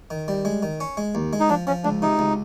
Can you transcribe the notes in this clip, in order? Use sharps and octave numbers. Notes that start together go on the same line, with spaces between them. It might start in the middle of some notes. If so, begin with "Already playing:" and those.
D#3
G3
G#3
D#3
C#4
G#3
D#2
G#3
D#4
F3 D4
F3 C#4
C#2 D4
C3 D#4
C#2